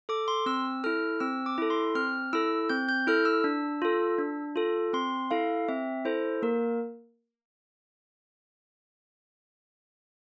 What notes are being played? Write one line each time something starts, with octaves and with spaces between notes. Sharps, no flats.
A4 D6
C6
C4 E6
E4 A4 F6
C4 E6
D6
E4 A4
C6
C4 F6
E4 A4 E6
C4 G6
G6
E4 A4 F6
E6
D4
F4 A4
D4
F4 A4
C4 C6
E4 A4 F5
C4 E5
E4 A4 C5
A#3 A#4